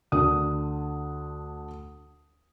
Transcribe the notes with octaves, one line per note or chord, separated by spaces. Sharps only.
D2 D4 D#6